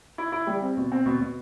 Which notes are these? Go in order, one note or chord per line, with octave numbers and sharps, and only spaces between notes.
E4
E4
G3
C4
B2
C4
B2
B2